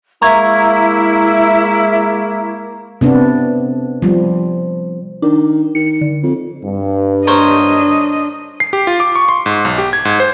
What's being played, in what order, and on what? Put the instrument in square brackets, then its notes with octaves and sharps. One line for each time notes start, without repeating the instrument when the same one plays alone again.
[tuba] G#3 [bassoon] A#3 [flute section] E4 [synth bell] A#5 C#6 G#6
[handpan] C3 B3 D4
F3 G3
[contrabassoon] D#3 [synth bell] D4
[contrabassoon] D#3 [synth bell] C#7
[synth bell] D3
[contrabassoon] F2
[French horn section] G2
[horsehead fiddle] D4 D#5 [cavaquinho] A#4 C5 C#5
[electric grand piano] C7
G4
F4
D6
C#6
C6
G#2
B1
G4
G#6
G#2
C5